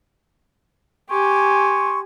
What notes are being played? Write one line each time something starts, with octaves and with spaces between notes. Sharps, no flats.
G4 G#5 C6 C#6